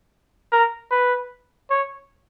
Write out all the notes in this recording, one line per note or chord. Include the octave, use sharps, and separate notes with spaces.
A#4
B4
C#5